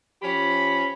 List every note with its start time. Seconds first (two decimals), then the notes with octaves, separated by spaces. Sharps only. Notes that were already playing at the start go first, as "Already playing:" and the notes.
0.22 F3 C#4 G4 B5